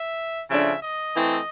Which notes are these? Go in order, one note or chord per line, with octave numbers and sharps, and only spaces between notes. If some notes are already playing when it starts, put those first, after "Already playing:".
Already playing: E5
C#3 F3 A3 D4 E5
D#5
E3 A3 C4 E4